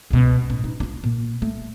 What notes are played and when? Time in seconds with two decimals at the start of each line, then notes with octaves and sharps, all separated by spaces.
0.11 C#2 B2
0.50 A1
0.64 D#4
0.80 D4 F4
1.04 A#2
1.42 A3